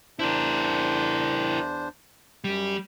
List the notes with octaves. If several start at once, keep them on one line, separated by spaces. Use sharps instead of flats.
E2 D4 E4 A#4 C5
F#2 G3